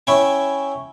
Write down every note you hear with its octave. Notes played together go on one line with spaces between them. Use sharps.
C#4 E4 G5 G#5